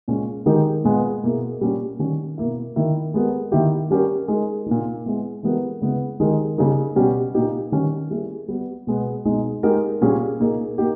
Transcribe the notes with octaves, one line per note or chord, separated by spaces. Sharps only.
A#2 G#3 C#4
D#3 G#3 D#4 G4 A#4
A#2 G#3 B3
B2 A#3 E4 G#4
A#2 G3 A#3 C#4
D#3 G3 C#4
B2 A#3 E4
D#3 A#3 E4
G#3 B3 G4 A#4
D#3 A#3 E4 G4
G3 C#4 G4 A#4
G#3 D#4 A#4
A#2 A#3 D#4
G#3 B3 E4
E3 G#3 B3 G4 A#4
C#3 G#3 B3 E4
D#3 G#3 D#4 G4 A#4
C#3 G3 A#3 D#4 A#4
B2 G3 C#4 G4
A#2 A#3 D#4 G4
D#3 G3 C#4
G3 A#3 E4 G#4
G3 B3 G4
B2 G#3 B3
B2 G#3 D#4
G#3 D#4 G4 A#4
A#2 G3 C#4 G#4
A#2 A#3 D#4 G#4
A#3 D#4 G4